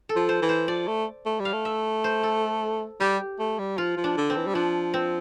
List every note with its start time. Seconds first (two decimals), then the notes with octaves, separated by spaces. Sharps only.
0.09 A4
0.16 F3
0.29 C5
0.42 E3
0.49 C5
0.68 F3 D5
0.88 A3
1.26 A3
1.40 G3
1.45 F5
1.53 A3
1.65 E5
2.04 C5
2.23 A4
3.00 G3 G4
3.39 A3
3.59 G3
3.78 F3 F4
3.97 F3
4.04 D4
4.17 D3
4.30 C4
4.36 E3
4.47 G3
4.55 F3 D4
4.94 C4